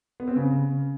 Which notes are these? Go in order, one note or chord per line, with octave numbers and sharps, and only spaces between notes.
B3
C4
C#3